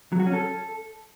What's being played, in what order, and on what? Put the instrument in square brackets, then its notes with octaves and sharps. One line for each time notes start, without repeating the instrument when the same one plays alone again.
[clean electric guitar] F#3
F#4
C#4
A4